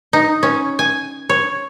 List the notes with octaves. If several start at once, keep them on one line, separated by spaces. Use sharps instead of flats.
D#4
C#4
G#5
C#5